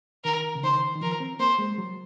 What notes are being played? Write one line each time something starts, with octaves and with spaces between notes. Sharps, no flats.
D#3 A#4
C#3
D#3 C5
D#3
F3 A#4
C4
A#3 C5
G#3
F#3